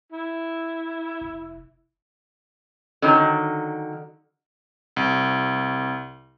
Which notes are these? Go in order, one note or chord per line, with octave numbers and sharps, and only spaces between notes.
E4
F1
D3 D#3 F#3
C2